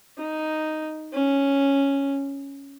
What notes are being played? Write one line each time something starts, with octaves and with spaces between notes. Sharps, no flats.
D#4
C#4